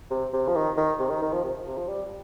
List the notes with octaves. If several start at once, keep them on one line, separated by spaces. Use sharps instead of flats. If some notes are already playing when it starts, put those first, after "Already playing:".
C3
C3
F3
D#3
D#3
C3
D#3
D#3
F3
C3
C3
F3
G3